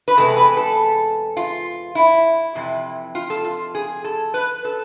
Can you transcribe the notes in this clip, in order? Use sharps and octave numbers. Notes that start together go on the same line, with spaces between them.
B4
E2 C3 G#3 A4
B4
A4
F4
E4
F2 C3 E3
F4
A4
F4
G#4
A4
B4
A4